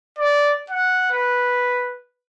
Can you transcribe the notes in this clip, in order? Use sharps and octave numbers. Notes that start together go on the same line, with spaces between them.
D5
F#5
B4